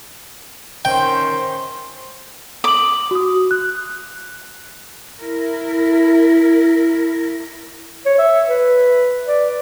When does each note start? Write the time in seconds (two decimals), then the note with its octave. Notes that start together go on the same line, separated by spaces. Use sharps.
0.85 D#3 C#4 C5 G5
2.64 D6 D#6 F#7
3.11 F#4 D#6
3.51 F#6
5.19 E4 A#4
8.06 C#5
8.19 E5
8.48 B4
9.27 D5